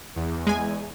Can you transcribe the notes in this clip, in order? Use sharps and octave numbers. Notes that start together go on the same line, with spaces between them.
E2
G#3 G#5